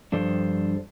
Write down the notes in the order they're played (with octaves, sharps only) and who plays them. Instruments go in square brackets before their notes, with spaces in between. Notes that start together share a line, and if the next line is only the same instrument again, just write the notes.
[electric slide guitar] G2 F3 D4 A4 C5